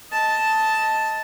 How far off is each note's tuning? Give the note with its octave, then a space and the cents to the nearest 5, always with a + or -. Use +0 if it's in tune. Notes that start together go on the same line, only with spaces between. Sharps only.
D#5 +20 A5 +0